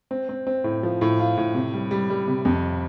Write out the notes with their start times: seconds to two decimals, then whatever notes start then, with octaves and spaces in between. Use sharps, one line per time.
0.11 C4
0.29 C4
0.47 C4
0.64 A2
0.83 F3
1.01 A2
1.20 F4
1.37 A2
1.55 C3
1.74 G3
1.91 G3
2.10 G3
2.28 C3
2.45 F2